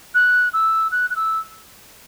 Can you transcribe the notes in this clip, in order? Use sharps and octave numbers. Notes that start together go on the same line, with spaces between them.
F#6
E6
F#6
F#6
E6